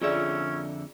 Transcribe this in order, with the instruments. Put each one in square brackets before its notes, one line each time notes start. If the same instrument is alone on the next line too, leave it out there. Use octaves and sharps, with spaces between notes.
[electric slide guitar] F2 D3 E5 [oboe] C#4 [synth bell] F4 G#4 D5